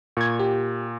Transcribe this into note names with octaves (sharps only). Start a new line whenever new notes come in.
A#2 C#6 G#6
G4